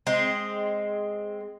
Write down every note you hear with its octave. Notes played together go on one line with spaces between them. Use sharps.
G#3 C4